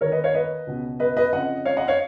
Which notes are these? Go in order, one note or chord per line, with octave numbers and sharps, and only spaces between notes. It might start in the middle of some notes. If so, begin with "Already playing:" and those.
D#2 D#3 A#4 C#5
B4 D#5
C#5 F5
B4 D#5
C#2 B2
B4 D#5
B4 D#5
F2 C#3 D#5 F#5
C#5 F5
D#5 F#5
C#5 F5